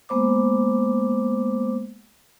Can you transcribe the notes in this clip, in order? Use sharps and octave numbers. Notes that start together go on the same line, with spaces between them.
G#3 A#3 B3 C5 D6